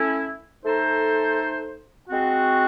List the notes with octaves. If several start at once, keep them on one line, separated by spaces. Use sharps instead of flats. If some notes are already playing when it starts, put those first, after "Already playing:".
Already playing: A3 C#4 E4
A3 D#4 A4 C5
G#3 C4 F#4